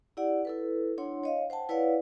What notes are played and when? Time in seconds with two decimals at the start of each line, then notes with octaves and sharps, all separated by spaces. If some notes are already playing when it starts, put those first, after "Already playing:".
0.17 E4 G4 D5 F#5
0.45 E4 A4 B4
0.98 D4 E4 C#5 F#5 C6
1.24 C#5 D#5 F5
1.50 C5 F#5 G5 A5
1.69 E4 B4 C#5 D5 F5 F#5